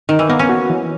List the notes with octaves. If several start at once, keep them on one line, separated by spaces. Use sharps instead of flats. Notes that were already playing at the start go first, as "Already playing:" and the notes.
D#3 D#4
E3
A#3 B3
C#4
F#4
E3